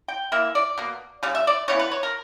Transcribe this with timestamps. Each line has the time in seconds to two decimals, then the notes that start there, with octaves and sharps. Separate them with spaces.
0.08 G5
0.32 E3 A#3 E5
0.55 D5
0.78 B2 A#3
1.23 C#3 G3
1.35 E5
1.47 D5
1.68 C#3 E3 B3 C#5
1.79 B4
1.91 C#5
2.03 A#4